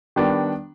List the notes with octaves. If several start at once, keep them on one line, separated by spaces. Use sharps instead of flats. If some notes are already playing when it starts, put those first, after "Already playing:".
D#3 G3 B3 D4